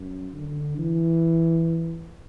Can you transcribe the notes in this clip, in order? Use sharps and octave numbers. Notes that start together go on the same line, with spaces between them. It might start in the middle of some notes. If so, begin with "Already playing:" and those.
Already playing: F#2
D3
E3